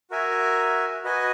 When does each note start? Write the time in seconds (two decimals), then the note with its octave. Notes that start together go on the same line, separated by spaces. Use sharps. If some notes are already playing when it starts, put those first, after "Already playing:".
0.10 F#4 A#4 E5 G#5
1.04 F#4 B4 D#5 G#5